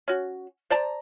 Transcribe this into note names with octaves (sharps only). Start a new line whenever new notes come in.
C#4 F#4
C5 D5 A5 A#5